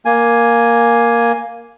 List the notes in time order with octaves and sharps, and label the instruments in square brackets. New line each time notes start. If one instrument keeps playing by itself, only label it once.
[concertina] A#3 G#5